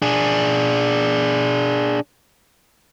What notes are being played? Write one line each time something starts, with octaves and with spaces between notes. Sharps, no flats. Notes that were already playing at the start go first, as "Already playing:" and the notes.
D4 G#4